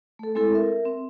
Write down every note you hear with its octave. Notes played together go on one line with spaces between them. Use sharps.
A3 A4
G#3 C4 E4 A4
A#4 E5
C4